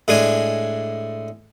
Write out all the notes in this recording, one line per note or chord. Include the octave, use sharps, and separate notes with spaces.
A2 G#3 D4 G#5